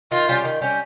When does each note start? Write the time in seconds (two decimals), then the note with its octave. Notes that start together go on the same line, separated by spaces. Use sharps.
0.12 D#3 F4
0.29 G3 C#4 G4
0.45 D#3
0.62 G3 C#4 G4